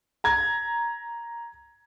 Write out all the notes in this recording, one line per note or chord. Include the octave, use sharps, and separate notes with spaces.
A#5 G#6